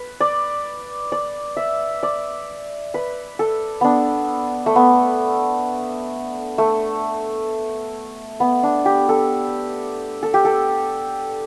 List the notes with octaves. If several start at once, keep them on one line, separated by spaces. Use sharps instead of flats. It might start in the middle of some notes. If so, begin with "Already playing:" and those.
Already playing: B4
D5
D5
E5
D5
B4
A4
B3 D4
A3
B3
A3
B3
D4
G4
A4
A4
G4
A4